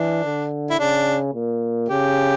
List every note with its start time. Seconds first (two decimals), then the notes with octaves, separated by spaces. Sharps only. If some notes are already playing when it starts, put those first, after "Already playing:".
Already playing: E3 D4
0.25 D3
0.70 E4
0.79 C#3 D4
1.34 A#2
1.89 C#3 G4